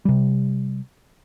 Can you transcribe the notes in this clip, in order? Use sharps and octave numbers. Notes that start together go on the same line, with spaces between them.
C3 G3